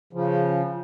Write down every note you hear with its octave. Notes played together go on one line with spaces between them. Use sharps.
C#3 F3